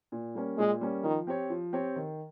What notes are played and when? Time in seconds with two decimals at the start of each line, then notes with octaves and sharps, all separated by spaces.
0.12 A#2
0.35 G3 A#3 C#4
0.58 A#2 G#3
0.81 G3 A#3 C#4
1.04 D#3 F3
1.27 C4 G4 C#5
1.50 F3
1.73 C4 G4 C#5
1.96 D#3